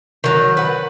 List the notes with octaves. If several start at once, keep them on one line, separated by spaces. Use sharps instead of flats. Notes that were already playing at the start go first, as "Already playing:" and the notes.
D#3 F#3
B4 F#5